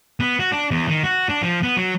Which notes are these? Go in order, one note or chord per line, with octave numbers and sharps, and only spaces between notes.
B3
F#4
D4
E2
D#3
F#4
D4
F3
B3
F#3